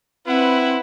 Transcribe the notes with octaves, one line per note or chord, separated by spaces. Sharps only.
C4 E4 B4 F#5